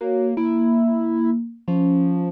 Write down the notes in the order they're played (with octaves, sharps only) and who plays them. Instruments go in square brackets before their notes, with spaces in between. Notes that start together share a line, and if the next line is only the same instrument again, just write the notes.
[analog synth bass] A#3 [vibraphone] F#4 C#5
[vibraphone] A#3 [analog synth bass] E4
[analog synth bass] F3 [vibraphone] C#4